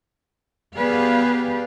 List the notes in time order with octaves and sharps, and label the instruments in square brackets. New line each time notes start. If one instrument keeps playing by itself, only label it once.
[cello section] B3 G4 G#4 B4 D5 F5